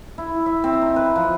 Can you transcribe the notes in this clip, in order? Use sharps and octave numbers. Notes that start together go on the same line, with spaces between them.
E4
E5
C4
D#4
B4
F3